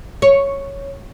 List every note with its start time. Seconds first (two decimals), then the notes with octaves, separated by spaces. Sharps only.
0.22 C#5